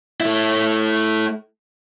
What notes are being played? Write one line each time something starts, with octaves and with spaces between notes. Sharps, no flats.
A3 E4